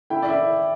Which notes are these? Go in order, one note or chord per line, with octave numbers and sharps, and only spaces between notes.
E4 G5
D5
E4 E5